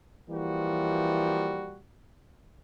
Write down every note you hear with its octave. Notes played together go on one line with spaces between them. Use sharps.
E3 F3 G3 A#3 F#4